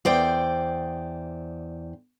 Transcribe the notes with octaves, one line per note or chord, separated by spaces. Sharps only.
E2 C5 D5 G5